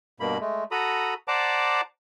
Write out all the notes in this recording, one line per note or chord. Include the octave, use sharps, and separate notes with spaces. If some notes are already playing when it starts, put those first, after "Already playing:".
G2 B2 A#3 B5
G#3 A3
F#4 A4 A#5 B5 D#6
C5 D5 F#5 A5 A#5 D6